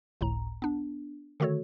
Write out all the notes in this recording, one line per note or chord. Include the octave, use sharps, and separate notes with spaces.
G1 C#2 A2 A#5
B3 D4
D3 D#3 A3 F#4 A4 C#5